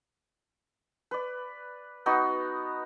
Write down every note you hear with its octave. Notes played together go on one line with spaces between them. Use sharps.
B4 D5
B3 D#4 F#4